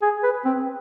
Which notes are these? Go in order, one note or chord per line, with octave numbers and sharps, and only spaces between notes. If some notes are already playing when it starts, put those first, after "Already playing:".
G#4
B4
C4